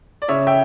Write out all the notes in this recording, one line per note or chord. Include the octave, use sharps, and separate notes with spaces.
D5
C#3 C#5 E5
E5 G5